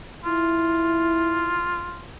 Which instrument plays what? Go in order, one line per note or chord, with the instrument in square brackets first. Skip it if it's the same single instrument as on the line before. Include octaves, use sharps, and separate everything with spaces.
[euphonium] E4 [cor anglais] F4